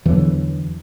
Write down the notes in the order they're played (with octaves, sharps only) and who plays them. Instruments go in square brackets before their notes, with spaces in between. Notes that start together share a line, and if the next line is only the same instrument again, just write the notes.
[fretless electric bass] E2 D3 E3 F#3